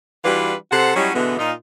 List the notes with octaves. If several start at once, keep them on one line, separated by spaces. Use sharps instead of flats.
E3 G3 D4 F4 F#4 B4
C3 A4 C5 F#5
F#3 G3 C#4 D#4 E4 F#4
B2 D3 E3 G#3 B3
A#2 D#4 F4